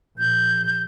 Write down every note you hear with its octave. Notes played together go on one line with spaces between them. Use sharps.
A#1 G6